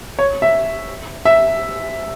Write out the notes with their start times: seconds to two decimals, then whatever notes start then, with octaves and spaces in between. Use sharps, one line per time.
0.19 C#5
0.42 E5
1.25 E5